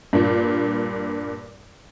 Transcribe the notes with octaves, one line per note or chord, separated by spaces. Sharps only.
G2 A#2